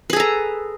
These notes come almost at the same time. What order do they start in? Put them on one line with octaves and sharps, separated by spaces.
B4 G#4 A4 A#5